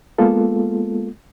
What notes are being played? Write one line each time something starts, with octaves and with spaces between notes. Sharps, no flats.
G#3 A#3 B3 F4 A4